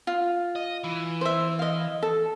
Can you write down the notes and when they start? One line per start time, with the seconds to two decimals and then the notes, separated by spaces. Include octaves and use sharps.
0.07 F4
0.56 D#5
0.84 E3
1.21 C5 E5
1.59 D#5 F5
2.03 A4